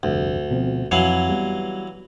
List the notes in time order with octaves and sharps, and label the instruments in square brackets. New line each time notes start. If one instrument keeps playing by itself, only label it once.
[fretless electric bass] F1 G2 [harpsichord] D2
[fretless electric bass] B2 F3 C4
[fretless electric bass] F2 [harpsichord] E3 F#3 F5
[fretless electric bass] G3 B3